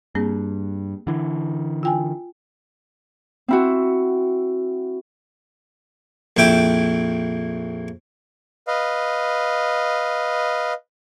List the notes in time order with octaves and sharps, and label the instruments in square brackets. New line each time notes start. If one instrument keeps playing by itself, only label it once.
[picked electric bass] G2 [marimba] A#3 C4 G#4
[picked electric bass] D3 E3
[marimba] F4 G5 G#5
[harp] C4 E4 F#4
[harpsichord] A#1 F2 E4 G5 D6
[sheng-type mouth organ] B4 D#5 F5